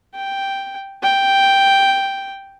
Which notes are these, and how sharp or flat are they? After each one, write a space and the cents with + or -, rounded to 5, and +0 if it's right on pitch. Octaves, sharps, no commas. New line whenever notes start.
G5 +0
G5 +0